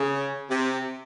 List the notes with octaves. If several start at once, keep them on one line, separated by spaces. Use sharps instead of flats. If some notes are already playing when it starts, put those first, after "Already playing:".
Already playing: C#3
C3